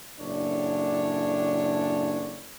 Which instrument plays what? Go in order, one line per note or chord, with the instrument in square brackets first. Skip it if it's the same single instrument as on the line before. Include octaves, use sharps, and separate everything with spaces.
[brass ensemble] F#1 A2 D4 C#5